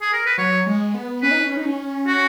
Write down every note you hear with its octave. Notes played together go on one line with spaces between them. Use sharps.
G#4
A#4
B4
F#3 C#5
G#3
B3
C#4 B4
D#4
C#4
D#4
C#4
F#4